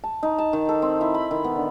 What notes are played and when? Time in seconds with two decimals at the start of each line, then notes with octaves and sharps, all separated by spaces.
0.04 A5
0.23 D#4
0.38 A5
0.53 D#3
0.69 A4
0.82 C4
1.01 E4
1.14 B5
1.31 D#3
1.44 B3
1.56 D3